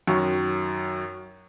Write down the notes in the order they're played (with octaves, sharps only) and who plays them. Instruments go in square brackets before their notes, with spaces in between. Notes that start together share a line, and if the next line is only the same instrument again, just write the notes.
[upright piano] F#2 D#3 F#3 C#6